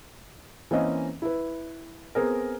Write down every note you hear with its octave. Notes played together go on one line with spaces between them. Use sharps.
E3 A#3 C4 C#4 D#5
E4 B4
B3 C4 G#4 A#4